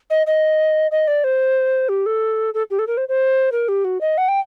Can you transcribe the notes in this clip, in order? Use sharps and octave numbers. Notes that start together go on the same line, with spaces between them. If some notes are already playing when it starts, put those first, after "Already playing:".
D#5
D#5
D#5
D5
C5
G4
A4
A4
G4
A4
A#4
C5
C5
A#4
G4
F#4
D#5
F#5
G5